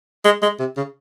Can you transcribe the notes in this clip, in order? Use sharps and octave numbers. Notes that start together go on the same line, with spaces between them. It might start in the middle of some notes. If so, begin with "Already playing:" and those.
G#3
G#3
C3
C#3